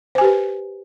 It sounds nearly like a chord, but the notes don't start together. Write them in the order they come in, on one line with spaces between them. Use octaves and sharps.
C5 G#5 G4 B4